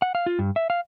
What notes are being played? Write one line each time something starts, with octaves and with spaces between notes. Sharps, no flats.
F#5
F5
F4
G2
E5
F5